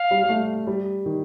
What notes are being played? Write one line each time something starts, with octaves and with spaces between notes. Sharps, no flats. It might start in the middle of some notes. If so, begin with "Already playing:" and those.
Already playing: F5
G3
G3
A3
G3
D#3